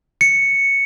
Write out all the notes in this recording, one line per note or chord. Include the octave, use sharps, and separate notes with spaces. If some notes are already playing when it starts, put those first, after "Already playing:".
C#7